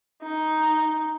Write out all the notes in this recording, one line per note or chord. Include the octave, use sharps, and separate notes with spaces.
D#4